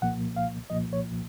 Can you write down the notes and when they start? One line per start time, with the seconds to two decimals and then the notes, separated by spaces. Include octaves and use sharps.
0.02 C2 A#2 F3 A#3 F#5
0.36 F5
0.70 C2 A#2 F3 A#3 D#5
0.93 C#5